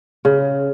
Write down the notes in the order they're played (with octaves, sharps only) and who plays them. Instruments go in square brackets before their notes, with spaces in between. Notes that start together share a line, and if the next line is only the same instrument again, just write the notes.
[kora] C#3